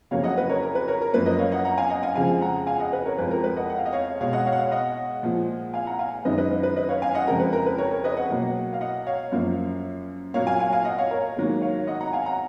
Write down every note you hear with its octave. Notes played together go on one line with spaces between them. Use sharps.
F2 C#3 F#3 A#3 C#5 F5
D#5 F#5
B4 D#5
A#4 C#5
A#4
B4
A#4 C#5
A#4
F#2 F3 A#3 B4
B4 D#5
C#5 F5
D#5 F#5
F#5 A#5
F5 G#5
D#5 F#5
F5 G#5
F2 C#3 F3 G#3 F5 G#5
F#5 A#5
F5 G#5
D#5 F#5
B4
A#4 C#5
F2 F3 G#3 B4
A#4
B4
D#5 F#5
F#5
F5
D#5
C#5 F5
B2 G#3 C#5 F5
D#5 F#5
C#5 F5
F#5
C#5 F5
D#5 F#5
A#2 F3 G#3
F5 G#5
F#5 A#5
F5 G#5
F#2 D#3 G#3 B4 D#5
B4 D#5
B4
B4
B4 D#5
C#5 F5
F5 G#5
D#5 F#5
F2 C#3 G#3 A#4
B4
A#4
B4
A#4 C#5
A#4 C#5
B4 D#5
D#5 F#5
B2 F#3 A#3
F5
D#5 F#5
C#5 F5
F#2 F3 A#3
A#2 F#3 A#3 C#5 F5
F5 G#5
F5 G#5
F5 G#5
D#5 F#5
C#5 F5
A#4 C#5
G#2 D#3 F#3 A#3
C#5 F5
D#5 F#5
F#5 A#5
F5 G#5
F#5 A#5